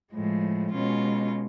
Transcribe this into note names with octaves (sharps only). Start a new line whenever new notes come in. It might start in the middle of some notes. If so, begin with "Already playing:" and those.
A2 F3 G#3
B2 G#3 C#4 F4